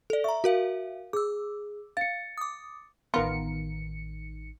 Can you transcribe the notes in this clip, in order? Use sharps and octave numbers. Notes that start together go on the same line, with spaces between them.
A4 D5
E5 A#5 C#6
F#4 A#4 F5
G#4 D6 E6
F5 A6 C#7
D6 D#6
A1 D#3 B3 F4 A#4 C#7